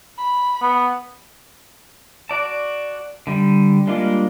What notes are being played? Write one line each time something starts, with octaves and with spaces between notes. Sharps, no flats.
B5
B3
F#4 D5 A5
D3 G3
G3 G#3 A#3 D4 F4